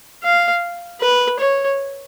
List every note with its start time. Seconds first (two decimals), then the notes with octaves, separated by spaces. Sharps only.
0.23 F5
1.01 B4
1.39 C#5